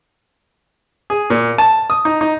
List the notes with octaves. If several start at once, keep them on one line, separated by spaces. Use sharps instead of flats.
G#4
A#2
A5
D#6
D#4
D#4